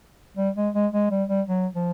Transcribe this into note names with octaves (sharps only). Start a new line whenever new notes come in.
G3
G#3
G#3
G#3
G3
G3
F#3
F3